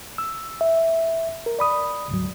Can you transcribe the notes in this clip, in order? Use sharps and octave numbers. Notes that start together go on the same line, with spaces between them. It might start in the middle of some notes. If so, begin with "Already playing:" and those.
E6
E5
A#4
D5 B5 D#6
D2 G#2 F#3